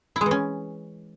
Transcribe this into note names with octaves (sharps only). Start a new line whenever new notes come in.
E4
G#3
E3
C#4